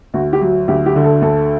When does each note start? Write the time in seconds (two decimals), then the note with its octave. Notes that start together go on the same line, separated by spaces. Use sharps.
0.14 D2 F#4
0.33 G4
0.41 F#3
0.68 D2 G4
0.86 G4
0.96 D3
1.04 A4
1.21 D2 A4